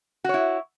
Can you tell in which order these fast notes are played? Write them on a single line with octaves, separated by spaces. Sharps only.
F#4 C#5 E4